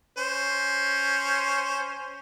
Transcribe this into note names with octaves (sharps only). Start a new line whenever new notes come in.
C#4 C5